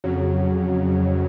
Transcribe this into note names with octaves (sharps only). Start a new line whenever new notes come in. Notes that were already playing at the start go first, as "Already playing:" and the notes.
F2 C#3 F#3